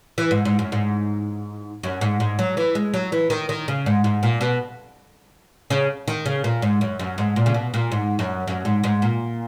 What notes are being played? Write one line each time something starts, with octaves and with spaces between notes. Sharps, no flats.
E3
G#2
G#2
F#2
G#2
F#2
G#2
G#2
F#3
E3
G#3
F#3
E3
D#3
D#3
C#3
G#2
G#2
A#2
B2
C#3
D#3
C#3
A#2
G#2
F#2
F#2
G#2
A#2
C#3
B2
A#2
G#2
F#2
F#2
G#2
G#2
A#2